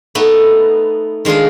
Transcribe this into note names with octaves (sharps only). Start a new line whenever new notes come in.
A3 B3 D#4
D#3 G#3 D4 F4 G#4